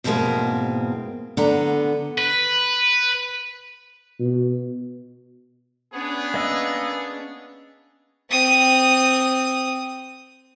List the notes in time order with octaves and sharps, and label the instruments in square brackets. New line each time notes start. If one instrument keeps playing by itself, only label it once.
[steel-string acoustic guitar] E2 G#2 B2 G#3 A#3 C4
D3 B3 A#5
[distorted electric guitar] B4
[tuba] B2
[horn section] B3 G#4 [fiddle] C#4 D4
[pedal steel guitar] A#3 D#5 E6
[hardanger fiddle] C4 D#6